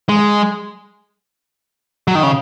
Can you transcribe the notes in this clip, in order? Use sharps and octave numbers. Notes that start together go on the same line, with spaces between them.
G#3
F#3
D#3
C#3